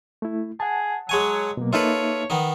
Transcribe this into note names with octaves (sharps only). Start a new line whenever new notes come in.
A3 E4
G#4 F#5 A5
F#3 G#3 C#5 G#5
B2 F#3 A#3
A#3 D#4 F4 A4 B4 C#5 E5
D#3 B3 D#4